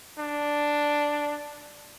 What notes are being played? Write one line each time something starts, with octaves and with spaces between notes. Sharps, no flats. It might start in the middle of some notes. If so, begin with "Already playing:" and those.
D4